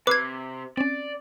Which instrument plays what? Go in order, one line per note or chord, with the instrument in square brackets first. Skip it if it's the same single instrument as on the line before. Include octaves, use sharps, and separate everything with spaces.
[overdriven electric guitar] C3 [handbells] B4 [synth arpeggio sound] B5 E6 C7 [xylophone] D6 G#6
[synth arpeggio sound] C4 C#4 [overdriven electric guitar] D5